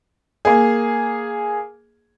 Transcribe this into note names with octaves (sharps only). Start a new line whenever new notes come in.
A#3 G#4